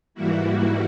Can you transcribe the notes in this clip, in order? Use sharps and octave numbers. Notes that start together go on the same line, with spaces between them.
G#2 E3 G3 A#3 E4 F#4